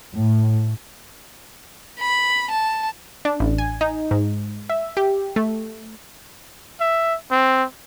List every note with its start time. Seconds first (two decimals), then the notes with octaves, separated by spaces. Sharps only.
0.15 A2
2.00 B5
2.51 A5
3.25 D4
3.40 A1
3.58 G#5
3.81 D#4
4.11 G#2
4.70 E5
4.97 G4
5.36 A3
6.80 E5
7.31 C4